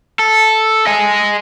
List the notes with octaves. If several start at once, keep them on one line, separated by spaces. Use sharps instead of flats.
A4
D#5 G#5